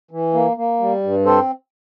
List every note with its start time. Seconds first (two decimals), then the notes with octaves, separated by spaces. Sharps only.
0.11 E3
0.33 A#3
0.57 A#3
0.79 G3
1.03 G2
1.25 C4 A4 C5